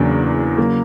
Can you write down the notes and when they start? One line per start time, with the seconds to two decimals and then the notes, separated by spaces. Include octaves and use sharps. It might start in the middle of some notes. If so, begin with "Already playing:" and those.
Already playing: E2 C#3 F#3 A#3 D4
0.58 C#3 F#3 A#3